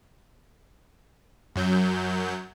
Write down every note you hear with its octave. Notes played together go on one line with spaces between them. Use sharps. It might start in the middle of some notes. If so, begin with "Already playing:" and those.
F#2 F#3 G6